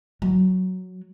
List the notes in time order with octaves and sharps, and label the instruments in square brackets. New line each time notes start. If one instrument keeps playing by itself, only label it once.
[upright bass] F#3